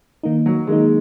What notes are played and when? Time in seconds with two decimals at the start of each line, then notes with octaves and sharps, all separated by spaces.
0.23 D#3 A#3 D#4
0.46 F#3
0.67 D#3 G#3 A#3 D#4